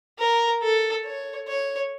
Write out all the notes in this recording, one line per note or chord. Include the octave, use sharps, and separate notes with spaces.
A#4
A4
C#5
C#5